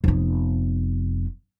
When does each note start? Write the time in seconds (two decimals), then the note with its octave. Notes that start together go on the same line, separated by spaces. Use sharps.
0.04 F1 B3